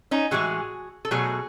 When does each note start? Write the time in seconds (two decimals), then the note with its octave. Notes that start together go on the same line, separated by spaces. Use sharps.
0.11 C#4 D#4
0.31 A2 E3 G#3 F#4 G#4
1.05 A4
1.11 B2 F#3 A3 F#4 G#4